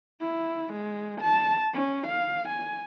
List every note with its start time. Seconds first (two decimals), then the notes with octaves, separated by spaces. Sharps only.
0.21 E4
0.73 G#3
1.21 A5
1.73 C#4
2.07 F5
2.49 G#5